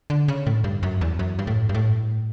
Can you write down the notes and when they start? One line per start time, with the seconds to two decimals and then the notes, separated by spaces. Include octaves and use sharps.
0.10 D3
0.28 C#3
0.46 A2
0.64 G2
0.83 F#2
1.01 E2
1.19 F#2
1.39 G2
1.47 A2
1.69 G2
1.74 A2